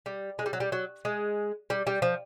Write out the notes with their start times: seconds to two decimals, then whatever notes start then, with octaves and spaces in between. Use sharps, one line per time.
0.06 G3
0.39 G#3
0.46 G3
0.53 F#3
0.60 G3
0.72 F#3
1.05 G#3
1.70 G3
1.87 G3
2.02 F3